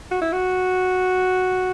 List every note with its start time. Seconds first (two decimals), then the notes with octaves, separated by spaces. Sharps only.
0.12 F#4
0.22 E4
0.33 F#4